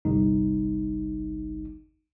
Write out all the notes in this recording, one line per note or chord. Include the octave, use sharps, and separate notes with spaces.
G1 C2 D#4